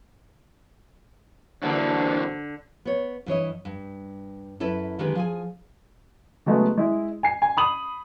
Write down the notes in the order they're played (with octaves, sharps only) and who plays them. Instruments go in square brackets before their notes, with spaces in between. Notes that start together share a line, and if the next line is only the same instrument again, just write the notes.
[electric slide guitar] G2 E3 A#3 [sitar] D3 [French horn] D4 [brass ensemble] F#4 C5
[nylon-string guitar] B3 C#5
G2 E3 C#5 D#5
G2
F#2 E4 A4 B4
D3 D#3 G#3 G4 B4
F3 G#4 G#5
[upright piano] C#3 F#3 G#3 A3 B3
G#3 E4
G#5 C7
G#5
B5 D#6 F#7